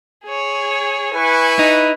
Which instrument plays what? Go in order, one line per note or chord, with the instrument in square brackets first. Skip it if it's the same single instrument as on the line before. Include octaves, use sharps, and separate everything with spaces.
[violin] G#4 C#5
[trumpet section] E4 B4 [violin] G#5 C#6
[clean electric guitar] D#4